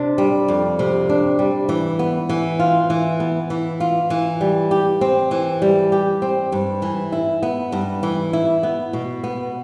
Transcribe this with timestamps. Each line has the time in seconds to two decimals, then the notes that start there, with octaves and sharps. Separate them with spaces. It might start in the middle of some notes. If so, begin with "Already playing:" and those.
Already playing: C3 D4
0.18 G3
0.48 F2
0.79 C3
1.09 D4
1.39 G3
1.69 E3
1.99 B3
2.29 E3
2.59 F4
2.90 E3
3.20 B3
3.50 E3
3.80 F4
4.10 E3
4.41 G3
4.71 G4
5.01 C4
5.31 E3
5.62 G3
5.92 G4
6.22 C4
6.52 G2
6.82 E3
7.12 E4
7.42 B3
7.72 G2
8.03 E3
8.33 E4
8.63 B3
8.93 B2
9.24 B3